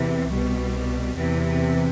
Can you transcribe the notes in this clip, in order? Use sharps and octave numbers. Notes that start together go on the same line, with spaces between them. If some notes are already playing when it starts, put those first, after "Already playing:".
Already playing: E2 C3 E3
C2 B2 G3
E2 C3 E3